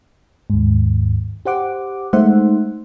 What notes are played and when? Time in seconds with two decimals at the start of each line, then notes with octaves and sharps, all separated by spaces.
0.50 D#2 G#2
1.45 G4 C5 F#5 D6
2.13 G#3 A3 D#4 C5 E5 F#5